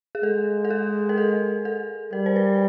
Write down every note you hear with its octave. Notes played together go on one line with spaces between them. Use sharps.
G#4
G#3 A4
A4
G#4
A#4
A4
A4
G3 A#4
C5
B4